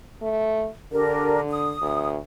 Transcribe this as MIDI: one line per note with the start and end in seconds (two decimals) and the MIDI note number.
0.22 0.68 57
0.92 1.76 50
0.92 1.40 62
0.92 1.40 67
0.92 1.40 70
1.50 2.09 87
1.82 2.17 38